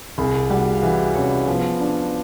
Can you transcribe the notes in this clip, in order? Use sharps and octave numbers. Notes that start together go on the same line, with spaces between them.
C2 G#4 G#5
G3 F#4 F#5
F5
E3 F#4 F#5
C2 C#4 C#5
F3 B3 B4
D4